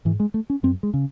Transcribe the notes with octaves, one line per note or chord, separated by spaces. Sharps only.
G#2 E3
G#3
A3
C#4
F#2 C4
G#3
C#3